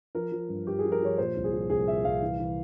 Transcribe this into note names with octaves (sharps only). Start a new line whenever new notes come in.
F3 A#4
F3
G2
G2 G4
G#4
F3
A#4
F3 C#5
A#2 C5
C2
G#4
F3
C2 G#4
A#2 E5
C2 F5
E3
E3